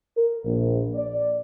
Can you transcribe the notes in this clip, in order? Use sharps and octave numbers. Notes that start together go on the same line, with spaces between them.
A#4
A#1
D5